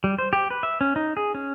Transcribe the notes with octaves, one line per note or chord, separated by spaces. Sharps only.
G3
C5
G4
B4
E5
C#4
D#4
G#4
C#4